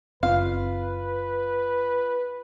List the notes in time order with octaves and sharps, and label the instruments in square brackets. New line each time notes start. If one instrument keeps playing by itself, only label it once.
[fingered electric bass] F#1 C4 [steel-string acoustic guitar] F4 [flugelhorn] B4 [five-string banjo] F5